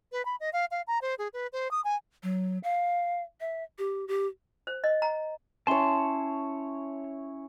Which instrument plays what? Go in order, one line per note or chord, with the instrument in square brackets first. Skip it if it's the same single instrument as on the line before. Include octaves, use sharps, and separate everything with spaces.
[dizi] B4
B5
D#5
F5
F5
A#5
C5
G#4
B4
C5
D#6
G#5
[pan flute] F#3
F5
E5
G4
G4
[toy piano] C5
D#5
A#5
[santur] C#4 E4 C#5 [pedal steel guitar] A5 C6